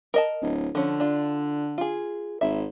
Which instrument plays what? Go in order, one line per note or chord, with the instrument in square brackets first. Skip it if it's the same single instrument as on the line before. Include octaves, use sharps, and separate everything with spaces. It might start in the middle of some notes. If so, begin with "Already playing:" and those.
[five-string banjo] A#4 D#5 A5
[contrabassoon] D1
[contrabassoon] D3 [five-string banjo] F3 C#4
[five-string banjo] D4 F4
F4 G#4
[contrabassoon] G#1 [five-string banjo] E5